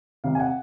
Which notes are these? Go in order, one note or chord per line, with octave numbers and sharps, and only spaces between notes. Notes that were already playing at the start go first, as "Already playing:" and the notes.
C3 F5
G#5
F#5